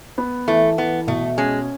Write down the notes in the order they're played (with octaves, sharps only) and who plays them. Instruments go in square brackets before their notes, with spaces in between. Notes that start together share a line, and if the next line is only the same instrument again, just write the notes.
[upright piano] B3
[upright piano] E3 [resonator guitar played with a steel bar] A3
[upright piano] E3 [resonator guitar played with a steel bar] B3
[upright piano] B2 [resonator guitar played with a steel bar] A3
[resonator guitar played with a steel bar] G#3 [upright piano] C#4